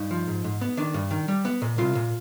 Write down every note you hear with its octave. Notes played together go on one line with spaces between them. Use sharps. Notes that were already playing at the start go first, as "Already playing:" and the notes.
Already playing: G2 D#4
F3
G#2
G#2
B3
D#3 D4
G2
D#3
G3
B3
A#2
C2 F4
A#2